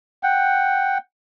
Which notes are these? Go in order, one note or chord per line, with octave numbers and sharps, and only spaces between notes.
F#5 G5